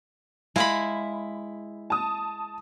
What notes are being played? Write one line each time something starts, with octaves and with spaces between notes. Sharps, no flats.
G#3 E4 E5 F5 B5
A5 D#6